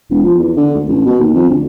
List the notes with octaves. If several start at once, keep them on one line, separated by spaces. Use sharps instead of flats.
E1
F3
E2
D3
D2
A1
B2
D#2
F2
D2